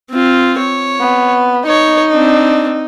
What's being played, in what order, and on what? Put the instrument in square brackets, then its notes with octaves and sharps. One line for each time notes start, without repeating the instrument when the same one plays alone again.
[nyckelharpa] C4 F4
C#5
[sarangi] B3
[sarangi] D#4 [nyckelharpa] C#5
[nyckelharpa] C4 D4